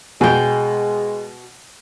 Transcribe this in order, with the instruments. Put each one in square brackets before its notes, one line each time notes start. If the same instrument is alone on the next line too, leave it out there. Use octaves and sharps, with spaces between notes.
[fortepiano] B2 [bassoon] G#3 [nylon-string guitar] G5 G#5